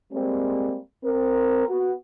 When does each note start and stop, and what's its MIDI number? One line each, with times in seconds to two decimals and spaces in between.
0.12 0.77 55
0.12 0.77 56
0.12 0.77 58
0.12 0.77 60
1.04 1.64 60
1.04 1.64 70
1.68 1.90 59
1.68 1.90 66